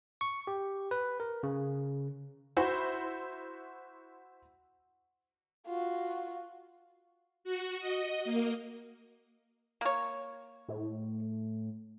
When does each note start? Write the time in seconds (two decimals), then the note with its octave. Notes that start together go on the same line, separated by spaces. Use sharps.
0.21 C#6
0.47 G4
0.91 B4
1.20 A#4
1.43 C#3
2.57 E4 F#4 C5 B5
5.67 F4 F#4
7.44 F#4
7.80 D#5
8.24 A#3
9.81 A#3 C#5
10.68 A2